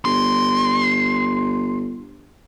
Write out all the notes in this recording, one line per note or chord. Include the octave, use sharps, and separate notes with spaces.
G1 C6